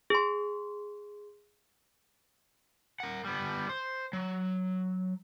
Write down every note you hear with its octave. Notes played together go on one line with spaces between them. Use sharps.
G#4 C6
A#4 F#5
G3 B3
C5
F#3